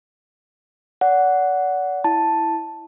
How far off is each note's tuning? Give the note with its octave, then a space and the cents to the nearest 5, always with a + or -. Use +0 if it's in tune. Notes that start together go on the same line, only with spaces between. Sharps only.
D5 -40 F#5 +0
E4 +0 A5 +0